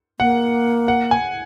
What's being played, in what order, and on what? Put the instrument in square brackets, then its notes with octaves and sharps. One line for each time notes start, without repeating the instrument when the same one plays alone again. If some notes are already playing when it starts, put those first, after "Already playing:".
[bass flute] A#3 [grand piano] F#5
[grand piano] F#5
G#5